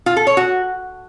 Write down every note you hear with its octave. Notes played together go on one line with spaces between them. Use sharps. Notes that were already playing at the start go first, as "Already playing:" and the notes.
F4
A4
C#5
F#4